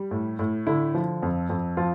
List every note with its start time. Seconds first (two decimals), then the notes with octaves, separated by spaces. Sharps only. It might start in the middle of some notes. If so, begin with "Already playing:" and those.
Already playing: G3
0.11 A2
0.39 A2
0.67 D3 E4
0.94 F3
1.23 F2
1.50 F2
1.77 F3 F4